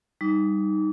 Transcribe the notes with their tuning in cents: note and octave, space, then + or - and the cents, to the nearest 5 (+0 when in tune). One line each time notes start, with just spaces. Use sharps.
G3 +0 D#4 +0 D6 -30